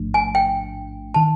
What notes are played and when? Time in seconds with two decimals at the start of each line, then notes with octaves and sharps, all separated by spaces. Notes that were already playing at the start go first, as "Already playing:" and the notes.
Already playing: A1 G#2 F3 A3 D4
0.14 G#5
0.35 G5
1.14 D#3 A5